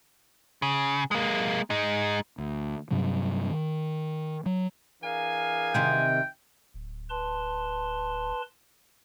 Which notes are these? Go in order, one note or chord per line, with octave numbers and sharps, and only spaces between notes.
C#3
G#3 A#3
G#3 D#4
D2
G2 C3 F#3 G3
D#3
F#3
E3 D4 G#4 A#4 F5 G#5
C3 D#3 C4 G5
D1
B4 A5 C6